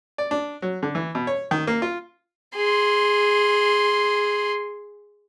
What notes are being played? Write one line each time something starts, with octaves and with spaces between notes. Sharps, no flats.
D5
D4
F#3
D3
E3
B2
C#5
D#3
A#3
F4
G#4 C6